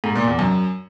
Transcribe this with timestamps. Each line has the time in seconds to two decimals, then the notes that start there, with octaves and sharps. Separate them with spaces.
0.04 G#2
0.15 A#2
0.27 E2
0.39 F#2